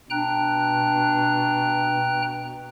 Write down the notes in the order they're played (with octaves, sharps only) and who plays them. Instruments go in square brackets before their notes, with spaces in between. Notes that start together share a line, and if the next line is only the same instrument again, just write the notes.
[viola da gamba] B2 [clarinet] D4 [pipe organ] G5 A#5 F#6